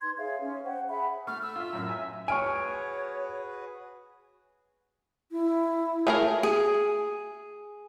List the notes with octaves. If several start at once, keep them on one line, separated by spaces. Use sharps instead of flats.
D#4 B4 C6 G#6
G#4 C#5 E5 F5
C#4
C5 F#5 G5
G#4 E5 F#5 B5
A3 C#6 F6
E6
F4 E5
F#2 A2
E5 G#5 A#5
F#4 G#4 B4 C#5 G#5 C#6 F6 D7
E4
A3 G#4 A#4
G#4